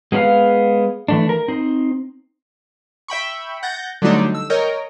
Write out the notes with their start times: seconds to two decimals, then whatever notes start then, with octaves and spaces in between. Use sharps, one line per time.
0.12 G#3 A#3 B3 D4 B4 F5
1.08 E3 A3 D4
1.29 A#4
1.48 C4 D#4 C5
3.08 E5 G5 B5 C#6
3.63 F#5 G6 A6 A#6
4.02 D3 F#3 G3 A3 D4 D#4
4.35 E6
4.50 A#4 C#5 D#5 G5